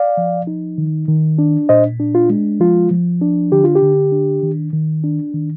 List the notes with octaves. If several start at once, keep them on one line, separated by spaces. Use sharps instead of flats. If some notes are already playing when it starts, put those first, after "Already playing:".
Already playing: D5 F5
F3
D#4
D#3
D#3
D4
A#2 C5 D#5
D4
F4
G#3
F3 F4
F3
D4
D3 G4
F4
G4
D3
D4
D#3
D#3
D4
D#3